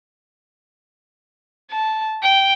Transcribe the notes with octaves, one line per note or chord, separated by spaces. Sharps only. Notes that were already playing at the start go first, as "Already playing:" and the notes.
A5
G5